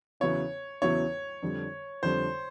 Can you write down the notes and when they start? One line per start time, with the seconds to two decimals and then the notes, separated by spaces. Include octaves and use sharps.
0.20 E2 C#3 F#3 B3 E4 C#5
0.82 E2 C#3 F#3 B3 E4 C#5
1.42 F2 D3 G3
2.03 F2 D3 G3 C5